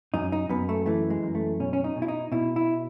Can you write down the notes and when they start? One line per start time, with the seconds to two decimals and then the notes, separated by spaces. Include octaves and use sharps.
0.14 F#2 D#4
0.32 D#4
0.49 F#2 B3
0.69 A3
0.86 E3 A3
1.10 G#3
1.23 F#2
1.35 A3
1.60 B2 C#4
1.73 C#4
1.84 D#4
1.96 B2
2.02 E4
2.08 D#4
2.32 B2 E4
2.56 E4